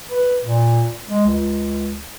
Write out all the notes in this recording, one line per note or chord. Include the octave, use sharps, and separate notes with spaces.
B4
A#2
G#3
C#2